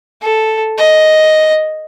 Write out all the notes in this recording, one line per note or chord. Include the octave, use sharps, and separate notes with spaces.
A4
D#5